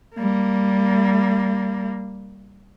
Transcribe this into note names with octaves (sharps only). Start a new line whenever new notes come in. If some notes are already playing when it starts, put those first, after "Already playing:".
G3 A#3